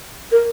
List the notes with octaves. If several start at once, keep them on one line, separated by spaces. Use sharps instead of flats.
A#4